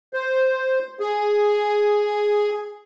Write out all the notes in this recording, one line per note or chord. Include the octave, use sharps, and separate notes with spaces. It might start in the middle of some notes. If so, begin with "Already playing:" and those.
C5
G#4